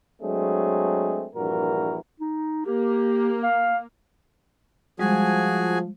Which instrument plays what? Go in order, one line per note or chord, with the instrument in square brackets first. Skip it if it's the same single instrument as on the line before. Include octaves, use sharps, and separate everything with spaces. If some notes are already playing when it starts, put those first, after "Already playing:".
[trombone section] F#3 G#3 A3 C4 D4 G#4
A#1 G2 A#2 E3 F#4 A#4
[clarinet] D#4
[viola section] A#3 [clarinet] G4
[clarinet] F5
[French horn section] F3 [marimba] G3 G#3 [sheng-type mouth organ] F#4 G#4 G#5